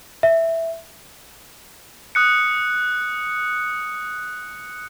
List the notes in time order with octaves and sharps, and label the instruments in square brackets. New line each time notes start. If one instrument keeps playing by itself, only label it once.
[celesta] E5
[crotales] D#6 F#6 C#7